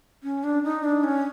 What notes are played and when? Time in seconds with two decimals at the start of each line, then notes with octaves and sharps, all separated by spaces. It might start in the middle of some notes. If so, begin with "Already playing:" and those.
0.23 C#4
0.44 D4
0.64 D#4
0.84 D4
1.04 C#4